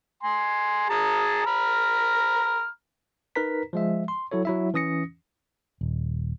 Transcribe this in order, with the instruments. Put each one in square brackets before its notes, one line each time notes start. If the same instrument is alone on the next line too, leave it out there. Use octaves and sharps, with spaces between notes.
[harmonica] G#5 C6
G#4 A5 A#5
A#5 B5 F6
[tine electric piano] D#4 A#4 B4 A#5 B6
F3 G#3 E5
C6
F#3 E4 A4 C#5
F#3 E4 E5
E3 C#4 D#6 A#6 C#7
[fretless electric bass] D#1